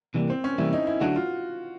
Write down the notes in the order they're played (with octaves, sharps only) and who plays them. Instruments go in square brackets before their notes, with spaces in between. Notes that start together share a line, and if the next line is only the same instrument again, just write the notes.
[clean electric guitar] C3 E3 G3 A#3
[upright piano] C4
C#4
[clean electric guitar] C3 E3 G3 A#3 [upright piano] E4
[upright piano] D#4
E4
[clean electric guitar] D3 F#3 A3 D4 [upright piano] F#4
[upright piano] F4